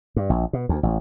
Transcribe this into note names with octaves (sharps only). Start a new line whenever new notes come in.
G2
A#1
B2
D2
A1